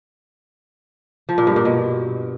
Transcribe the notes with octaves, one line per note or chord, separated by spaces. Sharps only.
F3
A#2
G2
A#2
B2